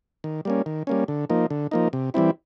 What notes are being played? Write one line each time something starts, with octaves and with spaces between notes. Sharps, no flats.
D#3
G3 A#3 C#4
D#3
G3 A#3 C#4
D3
F3 A#3 D#4
D3
F3 A#3 D#4
C3
E3 G3 C4 E4